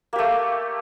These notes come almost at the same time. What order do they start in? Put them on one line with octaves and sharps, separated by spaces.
A#3 G4 A3